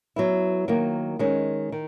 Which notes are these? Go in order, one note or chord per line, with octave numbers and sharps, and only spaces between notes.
F#3 B3 E4
D#3 F#3 A#3
D#3 G#3 C#4
D#3